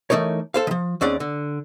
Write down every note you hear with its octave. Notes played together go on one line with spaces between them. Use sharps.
E3 A3 D#4 A#4 C#5
A4 C5 F5
D#3 F3
D#2 C4 C#4 G#4 D5 F#5
D3